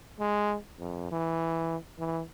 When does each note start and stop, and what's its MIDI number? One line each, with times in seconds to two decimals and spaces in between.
0.20 0.56 56
0.79 1.08 41
1.11 1.77 52
1.99 2.22 52